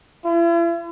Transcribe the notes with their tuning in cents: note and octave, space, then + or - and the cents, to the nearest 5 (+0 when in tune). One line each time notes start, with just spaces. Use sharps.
E4 +45